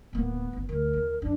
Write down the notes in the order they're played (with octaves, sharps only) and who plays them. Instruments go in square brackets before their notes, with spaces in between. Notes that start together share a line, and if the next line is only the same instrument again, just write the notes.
[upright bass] D1 A#3 [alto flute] B3
[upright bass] F#1 D#2
[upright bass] D2 [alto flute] A#4
[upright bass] D#2
[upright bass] F#2 [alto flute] D4